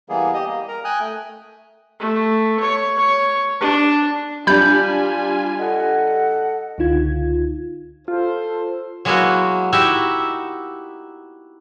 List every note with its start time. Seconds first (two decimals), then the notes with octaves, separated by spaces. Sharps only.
0.09 E3 G3 A#3 B3 G#4
0.34 G4 D#5
0.47 G3 A#3
0.68 A#4 A#5
0.84 G5 G#5 D#6 F#6
1.00 A3
2.00 A3
2.60 C#5
2.98 C#5
3.60 D4
4.47 G3 D4 F4 G#5 B5 G6
5.59 A4 D#5 F#5
6.78 C#2 D3 D#4 F4 G#6
8.08 F4 A4 C5
9.05 F#3 G#3 A#3 B3 E4 F#4
9.73 D#4 E4 F#4 G4 E5